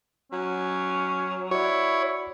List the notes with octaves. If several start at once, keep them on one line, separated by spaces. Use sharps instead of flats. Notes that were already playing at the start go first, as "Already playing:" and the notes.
F#3 C#4
E4 F#4 C#5 D5